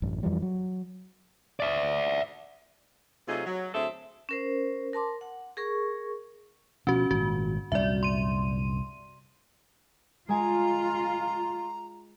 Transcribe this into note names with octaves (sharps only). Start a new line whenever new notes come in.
A1 F#2
F2 E3 F3 G3
F#3
D5 E5
C3 F#3 A3 D#4 F4 G#4
F#3
D2 C4 G#4 A4 E5
C#4 A#4 C5
A#4 A5 C6 D6
F#5
G#4 A#4 C#6
B2 F3 C#4 F#4
G#1 A#2 F#4
C2 F#2 A#2 D5 E5
C6 D#7
G#3 F4 G#5 A#5